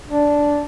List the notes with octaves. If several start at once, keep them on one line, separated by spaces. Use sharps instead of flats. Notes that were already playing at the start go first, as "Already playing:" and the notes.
D4